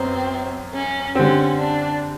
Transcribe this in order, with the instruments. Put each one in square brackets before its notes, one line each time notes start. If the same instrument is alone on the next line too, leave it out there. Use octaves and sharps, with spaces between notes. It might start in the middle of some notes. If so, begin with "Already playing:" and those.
Already playing: [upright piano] F#2 B3 [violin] C4
[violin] C#4
[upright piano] D3 G3 C4 [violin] C#4
[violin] D4